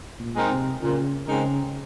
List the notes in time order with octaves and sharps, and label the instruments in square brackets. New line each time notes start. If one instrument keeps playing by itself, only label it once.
[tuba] A#2
[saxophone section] G#3 C4 D#4 A#4
[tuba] C3
[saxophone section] A#2 [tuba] C#3
[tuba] C#3 [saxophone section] G#3 C4 D#4 A#4